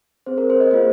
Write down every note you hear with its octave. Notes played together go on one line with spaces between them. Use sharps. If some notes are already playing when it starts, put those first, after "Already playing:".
C4 G#4 C5
A#4
C5
D#5
A#3 F4 G#4 C5